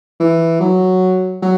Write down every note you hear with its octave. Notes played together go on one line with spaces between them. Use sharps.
E3
F#3
F#3